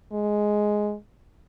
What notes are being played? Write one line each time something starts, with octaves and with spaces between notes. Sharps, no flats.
G#3